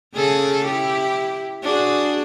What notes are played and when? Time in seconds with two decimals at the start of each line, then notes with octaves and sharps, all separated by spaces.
0.14 C#3 G#4 A4
0.65 E4 G4
1.63 D4 F#4 G#4